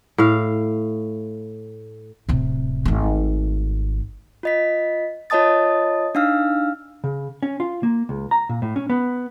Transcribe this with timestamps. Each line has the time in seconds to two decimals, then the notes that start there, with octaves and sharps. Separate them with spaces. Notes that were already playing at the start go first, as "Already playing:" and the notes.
0.18 A2 F5
2.29 D1 C3
2.85 G#1 A3
4.43 F4 D#5 B6
5.30 F4 C#5 D#5 A5 D#6 A6
6.15 D4 D#4 F5 E6 F6
7.04 C#3
7.42 C#4
7.60 F4
7.83 A#3
8.09 C#2
8.31 A#5
8.49 A#2
8.62 A2
8.76 C#4
8.90 B3